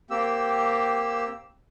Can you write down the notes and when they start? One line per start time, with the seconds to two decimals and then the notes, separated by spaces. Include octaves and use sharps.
0.10 A#3 C4 G4 E6